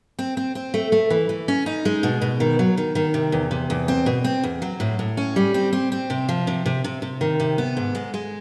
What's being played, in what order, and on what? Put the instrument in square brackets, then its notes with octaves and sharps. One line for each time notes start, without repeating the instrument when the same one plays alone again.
[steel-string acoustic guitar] C4
C4
C4
A3
A3
E3
E3
C#4
D#4
G#3
B2
B2
D#3
F#3
D#3
D#3
C3
E2
C3
E2
C4
B2
C4
E2
F#3
A2
A2
C#4
G3
C4
C4
C4
C3
F3
C3
C3
C3
C3
D#3
C3
B3
G#2
G#3
G#3